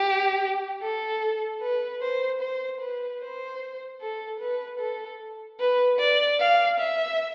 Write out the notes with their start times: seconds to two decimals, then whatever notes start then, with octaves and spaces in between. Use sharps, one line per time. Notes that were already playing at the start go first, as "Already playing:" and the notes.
Already playing: G4
0.82 A4
1.62 B4
2.02 C5
2.42 C5
2.81 B4
3.21 C5
4.01 A4
4.40 B4
4.80 A4
5.60 B4
5.99 D5
6.40 F5
6.79 E5